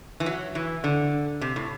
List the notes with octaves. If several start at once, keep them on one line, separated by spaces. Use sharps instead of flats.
E3
F#3
E3
D3
C3
A2